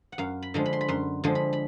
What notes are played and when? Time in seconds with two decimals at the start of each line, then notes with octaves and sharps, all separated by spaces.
0.12 F#5
0.18 F#2 F5
0.42 B5
0.54 D3 F3 G#3
0.66 B5
0.73 C6
0.81 B5
0.88 F#2 C6
1.24 D3 F3 G#3
1.35 B5
1.53 B5